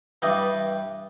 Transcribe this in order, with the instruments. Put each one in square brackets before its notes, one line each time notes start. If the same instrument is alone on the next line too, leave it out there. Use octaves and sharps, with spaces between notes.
[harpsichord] G2 E3 G3 D#5